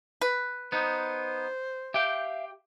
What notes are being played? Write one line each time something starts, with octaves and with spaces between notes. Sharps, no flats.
B4
B3 D#4 C5
G4 E5 F5 G5